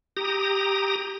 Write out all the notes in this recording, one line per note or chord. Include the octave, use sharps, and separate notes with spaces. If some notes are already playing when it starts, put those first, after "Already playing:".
G4 A#5 D#6